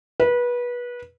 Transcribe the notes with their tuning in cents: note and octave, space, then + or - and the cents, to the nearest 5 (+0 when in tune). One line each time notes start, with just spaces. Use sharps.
B4 -25